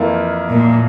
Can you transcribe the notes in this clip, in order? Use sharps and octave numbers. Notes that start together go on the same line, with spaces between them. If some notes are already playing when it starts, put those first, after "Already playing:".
Already playing: F2 E3 A#3 E4
A#2